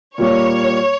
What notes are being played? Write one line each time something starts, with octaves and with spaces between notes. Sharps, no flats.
A#2 G3 A#3 C#5